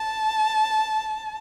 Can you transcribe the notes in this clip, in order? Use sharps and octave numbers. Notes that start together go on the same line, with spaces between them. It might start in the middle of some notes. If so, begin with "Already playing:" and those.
Already playing: A5